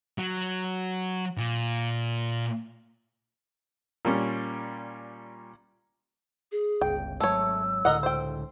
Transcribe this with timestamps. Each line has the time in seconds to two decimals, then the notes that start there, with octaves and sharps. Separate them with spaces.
0.18 F#3
1.37 A#2
4.05 A#2 G3 C#4
6.52 G#4
6.81 G1 C#2 G5
7.20 G#1 F#3 A3 C#5 E6
7.85 C#2 A2 D3 A#4 D#5 F#5
8.03 C5 G5